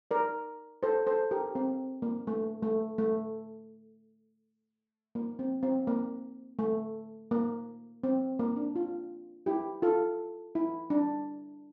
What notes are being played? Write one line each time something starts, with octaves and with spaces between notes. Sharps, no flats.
A#4 D5
A4 C5
A4 C5
G4 A#4
C4
A#3
A3
A3
A3
A#3
C4
C4
A#3
A3
A#3
C4
A#3
D4
F4
E4 G4
F4 A4
E4
D4